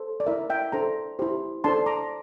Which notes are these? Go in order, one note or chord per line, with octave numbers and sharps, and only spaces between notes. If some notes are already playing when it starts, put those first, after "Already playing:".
Already playing: A4 C5
D5
E4 A#4 E5
E5 G5
D4 A4 C5 G5 A#5
E4 G4 C5
D4 A4 C5 A5 C6
A#5 D6